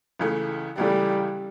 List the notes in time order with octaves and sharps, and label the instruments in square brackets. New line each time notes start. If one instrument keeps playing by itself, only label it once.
[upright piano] C#2 C#3 E3 A3
[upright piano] C#2 C#3 E3 A3 [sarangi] G3